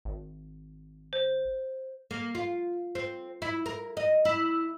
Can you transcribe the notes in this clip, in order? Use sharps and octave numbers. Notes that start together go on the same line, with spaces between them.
G#1
C5
A#3
F4
C4
E4
A#4
D#5
E4